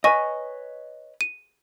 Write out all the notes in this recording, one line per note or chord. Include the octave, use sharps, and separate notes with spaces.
B4 C#5 D#5 G#5 C#6 A#6
D#7